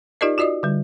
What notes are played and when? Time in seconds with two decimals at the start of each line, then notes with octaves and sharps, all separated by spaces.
0.21 D#4 F4 G4 A#4 D5 D#5
0.38 F4 F#4 D5 D#5 D#6
0.63 D3 G3